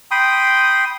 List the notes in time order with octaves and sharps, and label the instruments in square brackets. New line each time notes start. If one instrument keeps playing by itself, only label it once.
[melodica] G5 B5 C6 D#6